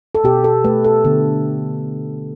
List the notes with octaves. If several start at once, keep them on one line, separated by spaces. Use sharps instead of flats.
A4
B2 G4
A4
A3 B4
A4
D3 B3